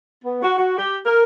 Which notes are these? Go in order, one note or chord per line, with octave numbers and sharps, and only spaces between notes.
B3
F#4
F#4
G4
A#4